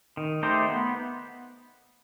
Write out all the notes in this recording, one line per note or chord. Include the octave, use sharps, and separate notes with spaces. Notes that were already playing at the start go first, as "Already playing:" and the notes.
D#3
A3 D#4 G4 C5
B3